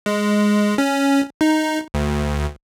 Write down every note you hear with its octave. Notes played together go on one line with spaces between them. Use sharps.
G#3
C#4
D#4
D2